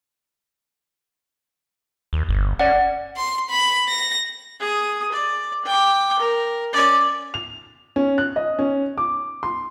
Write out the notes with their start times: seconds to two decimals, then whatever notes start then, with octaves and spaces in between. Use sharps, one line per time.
2.13 D#2
2.29 G1
2.59 C#4 D5 F#5
3.17 C6
3.51 B5
3.88 A#6
4.60 G#4 D#6
5.12 D5
5.65 G5 D6
6.19 A#4
6.73 C#4 D5
7.34 F7
7.96 C#4
8.18 F#6
8.36 D#5
8.59 C#4
8.98 D6
9.43 C6